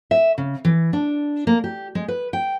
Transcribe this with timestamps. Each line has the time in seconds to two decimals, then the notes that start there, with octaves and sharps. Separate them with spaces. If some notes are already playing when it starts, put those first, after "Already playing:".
0.11 E5
0.38 C#3
0.65 E3
0.93 D4
1.47 A#3
1.64 G4
1.95 G#3
2.08 B4
2.33 G5